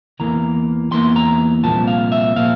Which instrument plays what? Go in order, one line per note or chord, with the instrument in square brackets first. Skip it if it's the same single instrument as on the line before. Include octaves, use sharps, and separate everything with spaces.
[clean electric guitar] E2 E3 A#3 A#5
E2 E3 A#3 C6
A#5
C2 A#2 F3 A5
F5
E5
A#2 F3 F5